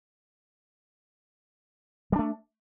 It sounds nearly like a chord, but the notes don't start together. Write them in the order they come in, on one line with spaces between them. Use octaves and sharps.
G3 D4 A3